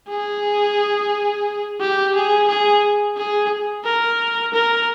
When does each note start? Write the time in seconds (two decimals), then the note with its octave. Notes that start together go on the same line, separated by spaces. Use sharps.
0.09 G#4
1.80 G4
2.15 G#4
2.48 G#4
3.17 G#4
3.85 A#4
4.54 A#4